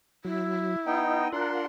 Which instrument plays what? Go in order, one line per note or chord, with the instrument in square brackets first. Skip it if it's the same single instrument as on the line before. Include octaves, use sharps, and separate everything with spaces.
[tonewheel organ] F#3 [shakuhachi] E4
[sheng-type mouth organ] B3 D#4 G5 [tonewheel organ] D#5
[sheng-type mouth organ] D4 C6 [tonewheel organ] F4 A#4 F#5